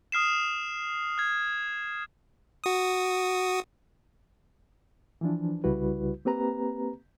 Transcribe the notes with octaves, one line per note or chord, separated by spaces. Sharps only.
D#6 F6 C7 E7
F6 G#6
F#4 D#6
E3 F3 D4
C2 C#3 G3 E4 F#4 B4
A#3 C4 G4 B4 A#5